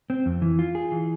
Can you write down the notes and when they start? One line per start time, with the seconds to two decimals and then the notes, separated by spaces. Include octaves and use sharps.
0.10 C4
0.26 F2
0.42 E3
0.59 F4
0.75 G#4
0.92 E3